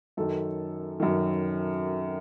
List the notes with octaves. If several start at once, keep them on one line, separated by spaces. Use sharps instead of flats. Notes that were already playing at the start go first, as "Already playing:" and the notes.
F#2 D#3 A4
F#2 D#3